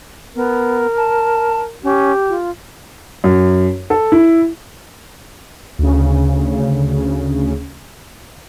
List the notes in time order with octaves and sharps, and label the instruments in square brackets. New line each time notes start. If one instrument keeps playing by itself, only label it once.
[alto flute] B3 [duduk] A#4
[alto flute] A5
[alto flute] C#4 [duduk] G4
[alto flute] F4
[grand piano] F#2
A4
E4
[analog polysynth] D2 C#3